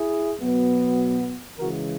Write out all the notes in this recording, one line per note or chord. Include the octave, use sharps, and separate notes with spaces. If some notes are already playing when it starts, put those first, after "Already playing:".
Already playing: E4 G#4
B2 F#3 B3
C#3 E3 G#3 F#4 A#4